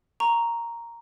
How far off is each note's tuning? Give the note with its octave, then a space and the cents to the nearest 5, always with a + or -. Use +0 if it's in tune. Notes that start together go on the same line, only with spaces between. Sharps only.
A#5 +0 C#6 +0